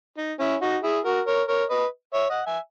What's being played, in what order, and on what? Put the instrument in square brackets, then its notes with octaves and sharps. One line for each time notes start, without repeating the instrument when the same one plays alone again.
[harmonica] D#4
C#4 E4
D#4 F#4
E4 G#4
F#4 A#4
A#4 C#5
A#4 C#5
B4 D#5
C#5 E5
D#5 F#5
E5 G#5